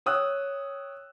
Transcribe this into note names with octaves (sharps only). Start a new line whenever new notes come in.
C#5 G5 D#6 E6 F#6